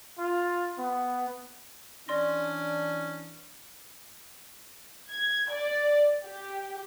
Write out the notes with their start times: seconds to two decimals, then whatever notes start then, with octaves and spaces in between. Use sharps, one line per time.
0.19 F4
0.78 B3
2.08 E3 C#4 D4 D5 C6 A#6
5.11 G#6
5.50 D5
6.25 G4